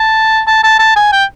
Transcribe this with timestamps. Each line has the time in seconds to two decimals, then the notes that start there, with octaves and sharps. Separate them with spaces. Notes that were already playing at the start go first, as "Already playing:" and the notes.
Already playing: A5
0.47 A5
0.64 A5
0.79 A5
0.96 G#5
1.12 G5